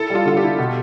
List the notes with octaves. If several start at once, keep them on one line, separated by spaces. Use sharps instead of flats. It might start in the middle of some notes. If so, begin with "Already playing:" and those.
Already playing: E4 A4
G3 F4
D3 F4
G4
E4
B2